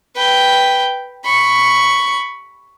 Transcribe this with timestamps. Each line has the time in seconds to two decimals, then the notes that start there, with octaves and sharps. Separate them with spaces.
0.16 B4 G5
1.24 B5 C#6